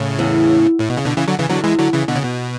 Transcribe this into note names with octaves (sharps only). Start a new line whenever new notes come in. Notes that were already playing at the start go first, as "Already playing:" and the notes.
Already playing: A2 C#3
E2
A2
B2
C#3
B2 D3
C#3 E3
D3 F#3
C#3 E3
E2 D3 F#3
E3 G#3
D3 F#3
C#3 E3
B2 D3
C#3
B2